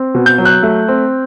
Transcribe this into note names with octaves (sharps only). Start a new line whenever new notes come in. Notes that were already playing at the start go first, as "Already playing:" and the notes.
Already playing: C4
B2
G6
F#3
F#6
A3
C4